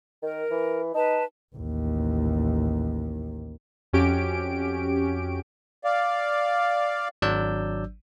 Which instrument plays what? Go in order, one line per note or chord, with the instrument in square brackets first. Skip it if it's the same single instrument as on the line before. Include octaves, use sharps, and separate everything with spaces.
[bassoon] D#3 [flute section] A#4
[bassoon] E3
[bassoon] D#4 [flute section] B4 A5
[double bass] A1 D#2
[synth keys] F2 C#4 F#4 G4 D7
[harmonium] D5 F5
[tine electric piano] G#1 F#3 D4 D5 E6 G6